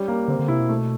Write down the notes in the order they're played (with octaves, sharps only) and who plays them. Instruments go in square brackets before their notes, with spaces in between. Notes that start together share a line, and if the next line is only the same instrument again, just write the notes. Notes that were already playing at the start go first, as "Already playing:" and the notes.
Already playing: [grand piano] G3 C#4
A#3
[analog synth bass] D3 [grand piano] C4
[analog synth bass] D3
[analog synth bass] C3 [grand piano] E4
[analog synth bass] B2
[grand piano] A3